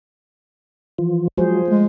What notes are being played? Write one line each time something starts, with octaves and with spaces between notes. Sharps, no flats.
E3 F3 F4
F3 F#3 G#3 F#4 G#4 C5
G#3 A3